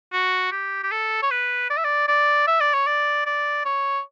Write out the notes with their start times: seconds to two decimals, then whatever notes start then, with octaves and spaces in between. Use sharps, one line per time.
0.13 F#4
0.52 G4
0.83 G4
0.91 A4
1.22 C#5
1.31 B4
1.70 D5
1.77 E5
1.84 D5
2.08 D5
2.47 E5
2.61 D5
2.74 C#5
2.87 D5
3.26 D5
3.65 C#5